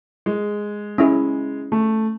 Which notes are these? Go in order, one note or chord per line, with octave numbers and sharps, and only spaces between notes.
G#3
C#4 E4 G#4
A3